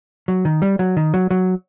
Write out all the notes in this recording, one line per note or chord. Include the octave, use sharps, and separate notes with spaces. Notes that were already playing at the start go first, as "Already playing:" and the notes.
F#3
D#3
G3
F#3
D#3
F#3
F#3